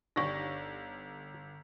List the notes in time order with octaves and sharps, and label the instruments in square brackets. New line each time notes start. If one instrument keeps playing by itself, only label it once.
[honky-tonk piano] G1 A#6 [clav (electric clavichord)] D4 G4 [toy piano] D#4 C#6